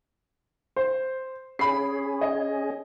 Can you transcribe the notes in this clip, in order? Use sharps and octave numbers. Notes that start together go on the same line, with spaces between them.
C5
C#4 G#4 B5 C7
D#5